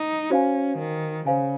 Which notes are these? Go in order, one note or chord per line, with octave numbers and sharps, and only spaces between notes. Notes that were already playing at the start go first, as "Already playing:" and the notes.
Already playing: D#4
C#4 F#4 C5 F5 G#5
D#3
C#3 C5 F5 G#5